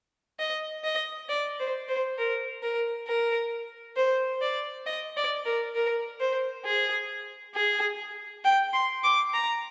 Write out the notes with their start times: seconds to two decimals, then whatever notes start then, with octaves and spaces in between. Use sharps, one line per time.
0.39 D#5
0.84 D#5
1.29 D5
1.59 C5
1.89 C5
2.18 A#4
2.63 A#4
3.08 A#4
3.97 C5
4.41 D5
4.86 D#5
5.17 D5
5.46 A#4
5.75 A#4
6.21 C5
6.65 G#4
7.55 G#4
8.45 G5
8.73 C6
9.04 D6
9.34 A#5